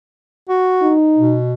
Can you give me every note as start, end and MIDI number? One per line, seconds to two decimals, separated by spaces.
0.49 0.93 66
0.82 1.35 63
1.18 1.54 47